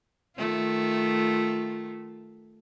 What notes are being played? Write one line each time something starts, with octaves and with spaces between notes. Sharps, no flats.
D#3 A3 F4